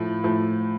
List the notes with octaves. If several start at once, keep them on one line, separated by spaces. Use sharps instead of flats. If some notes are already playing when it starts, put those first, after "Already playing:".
Already playing: A2 F3 A3
A2 F3 A3